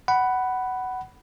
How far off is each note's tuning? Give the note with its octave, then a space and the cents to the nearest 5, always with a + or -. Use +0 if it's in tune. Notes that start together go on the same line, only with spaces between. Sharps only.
F#5 +15 B5 +0